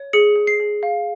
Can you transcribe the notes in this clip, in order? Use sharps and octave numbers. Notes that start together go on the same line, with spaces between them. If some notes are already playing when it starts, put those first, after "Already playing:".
Already playing: C#5
G#4 C#7
G#4
C7
G#4
F5